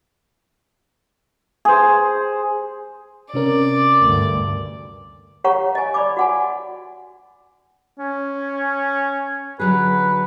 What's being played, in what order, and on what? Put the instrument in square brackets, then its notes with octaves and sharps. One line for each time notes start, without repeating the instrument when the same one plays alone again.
[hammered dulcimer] G#4 C5
[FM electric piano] C3 C#4 A#4 [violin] D5
[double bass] D2 G2
[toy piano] G4 C#5 F#5 A#5 C#6
D#5 G#5
D5 B5 D6
F#4 F#5 G#5
[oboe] C#4
[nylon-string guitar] D3 F#3 G#4 [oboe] B4